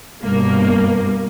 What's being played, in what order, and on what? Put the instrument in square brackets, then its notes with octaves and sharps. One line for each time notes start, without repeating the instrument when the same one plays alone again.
[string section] G2 B2 A#3